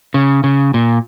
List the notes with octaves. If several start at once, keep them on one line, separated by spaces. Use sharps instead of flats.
C#3
C#3
A#2